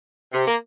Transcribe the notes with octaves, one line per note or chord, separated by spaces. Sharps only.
C3
A#3